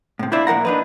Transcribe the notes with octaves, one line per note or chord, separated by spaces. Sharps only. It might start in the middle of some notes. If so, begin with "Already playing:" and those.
A2 C3
D4 E4 F4 C5 D5 E5
A#2 F3 A#4 F#5 A#5
D4 D#4 B4